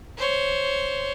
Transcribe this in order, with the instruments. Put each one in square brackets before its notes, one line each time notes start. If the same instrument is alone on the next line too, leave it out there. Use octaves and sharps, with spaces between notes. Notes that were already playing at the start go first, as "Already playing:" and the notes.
[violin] C5 C#5